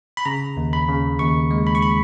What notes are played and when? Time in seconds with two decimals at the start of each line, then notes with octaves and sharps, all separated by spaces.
0.17 B5
0.25 C#3 A#5
0.57 D#2
0.73 B5
0.88 C#3
1.19 D#2 C#6
1.51 G#3
1.67 B5
1.75 C#6
1.82 B5